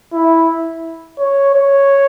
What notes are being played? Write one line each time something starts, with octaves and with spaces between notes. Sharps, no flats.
E4
C#5
C#5